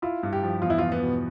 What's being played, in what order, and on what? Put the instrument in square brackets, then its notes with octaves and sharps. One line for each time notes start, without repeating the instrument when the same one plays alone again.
[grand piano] E4 [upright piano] F4
[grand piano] G2
[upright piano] G4
[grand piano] F3
[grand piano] E2 [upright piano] F4
[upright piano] E4
[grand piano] E2 [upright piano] F4
[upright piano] B3
[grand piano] B2